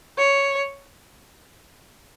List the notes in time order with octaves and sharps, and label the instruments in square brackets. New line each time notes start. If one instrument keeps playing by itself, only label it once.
[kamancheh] C#5